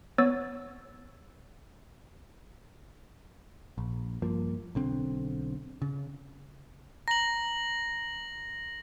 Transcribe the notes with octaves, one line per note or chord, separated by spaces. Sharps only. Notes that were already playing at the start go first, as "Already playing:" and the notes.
B3 C#5 E6 A6
A#1
G2 F3 A#3
B1 D3 C4
C#3
A#5 A#6 F#7